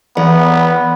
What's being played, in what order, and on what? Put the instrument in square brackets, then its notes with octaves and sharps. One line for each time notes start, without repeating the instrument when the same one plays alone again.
[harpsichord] E2 [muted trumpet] B3